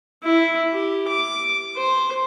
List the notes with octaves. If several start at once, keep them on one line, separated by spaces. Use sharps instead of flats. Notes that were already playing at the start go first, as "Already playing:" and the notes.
E4
G4
D6
C5